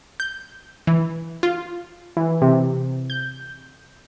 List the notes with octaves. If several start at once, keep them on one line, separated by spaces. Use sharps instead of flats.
G6
E3
F4
E3
C3
G6